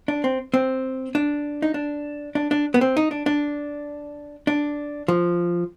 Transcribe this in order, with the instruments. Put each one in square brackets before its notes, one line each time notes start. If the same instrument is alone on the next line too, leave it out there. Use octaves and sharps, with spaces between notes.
[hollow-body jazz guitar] D4
C4
C4
D4
D#4
D4
D4
D4
B3
C4
D#4
D4
D4
D4
F3